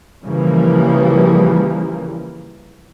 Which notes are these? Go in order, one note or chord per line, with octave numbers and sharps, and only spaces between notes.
C#3 E3 F3 G3 A#3